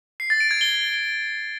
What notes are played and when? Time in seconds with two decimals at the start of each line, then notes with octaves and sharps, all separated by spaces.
0.20 C7
0.30 A6
0.40 D7
0.51 G#6
0.61 G7